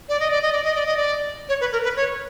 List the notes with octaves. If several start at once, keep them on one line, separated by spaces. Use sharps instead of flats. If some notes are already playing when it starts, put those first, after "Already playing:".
D5
D#5
D5
D#5
D5
D#5
D5
D#5
D5
C#5
B4
A#4
B4
C#5